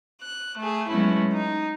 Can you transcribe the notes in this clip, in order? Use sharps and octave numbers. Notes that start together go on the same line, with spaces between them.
F#6
A3 G#4
F#3 G#3 A3 B3 C#4 E4
D#4